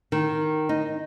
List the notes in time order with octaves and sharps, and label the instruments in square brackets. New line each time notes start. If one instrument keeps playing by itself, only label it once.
[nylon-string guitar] D#3
D#4